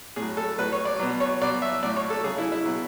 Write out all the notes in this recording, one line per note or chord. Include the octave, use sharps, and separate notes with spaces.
A2 F#3 G#4
A4
A2 F#3 B4
C#5
D5
B2 F#3
C#5
B2 F#3 D5
E5
A2 F#3 D5
C#5
A4
C#3 F#3 G#4
E4
E4
B2 F#3